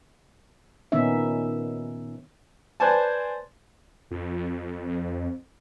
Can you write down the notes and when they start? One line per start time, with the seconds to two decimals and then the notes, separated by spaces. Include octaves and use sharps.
0.92 A#2 D#3 B3 C#4 D#4 E5
2.80 B4 C5 D5 G#5 A5
4.11 F2